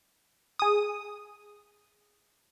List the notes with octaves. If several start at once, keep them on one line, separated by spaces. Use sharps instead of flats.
G#4 D#6